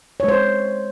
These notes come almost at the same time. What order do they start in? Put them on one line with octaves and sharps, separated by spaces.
C#5 G#3 C5